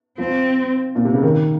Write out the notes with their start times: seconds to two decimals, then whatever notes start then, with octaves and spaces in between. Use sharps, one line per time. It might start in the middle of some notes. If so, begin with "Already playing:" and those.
0.18 F3 C4
0.95 A#2
1.05 C3
1.14 C#3
1.23 D#3